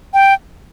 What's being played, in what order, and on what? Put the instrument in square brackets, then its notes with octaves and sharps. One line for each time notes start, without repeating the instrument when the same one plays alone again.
[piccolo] G5